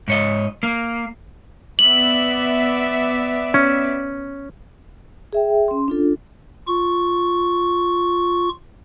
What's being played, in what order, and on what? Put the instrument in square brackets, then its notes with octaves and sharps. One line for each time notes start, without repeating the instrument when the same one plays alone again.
[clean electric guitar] G#2 C#5 D#5
A#3
[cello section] B3 D5 E5 [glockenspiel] F#7
[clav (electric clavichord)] C#4
[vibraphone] G#4 E5 G5
C#4 C6
D4 F4 A4
[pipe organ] F4 C#6